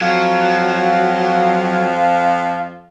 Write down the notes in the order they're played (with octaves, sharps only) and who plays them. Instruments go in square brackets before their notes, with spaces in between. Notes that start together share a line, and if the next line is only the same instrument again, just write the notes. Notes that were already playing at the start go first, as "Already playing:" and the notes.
[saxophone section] F2 F3 [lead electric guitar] F#3 [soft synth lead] F5